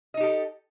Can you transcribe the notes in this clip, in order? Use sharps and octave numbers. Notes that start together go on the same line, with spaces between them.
D#4 G4 A4 D#5